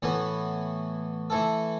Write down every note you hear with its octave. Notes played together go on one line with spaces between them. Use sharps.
A2 E3 B3 F#4
E3 A3 E4 A4